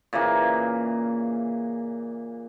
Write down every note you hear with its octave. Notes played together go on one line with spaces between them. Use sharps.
A#2 C#3 E3 A#3